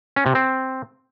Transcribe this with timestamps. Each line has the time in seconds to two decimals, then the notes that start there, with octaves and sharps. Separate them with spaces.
0.16 C#4
0.26 C3
0.35 C4